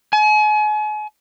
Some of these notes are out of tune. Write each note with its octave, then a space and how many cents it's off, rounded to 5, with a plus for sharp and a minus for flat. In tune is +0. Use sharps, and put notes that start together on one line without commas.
G#5 +40